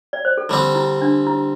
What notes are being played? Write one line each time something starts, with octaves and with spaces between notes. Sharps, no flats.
D5
C5
A4
D3 G3 C4 G4
E4
D4
E4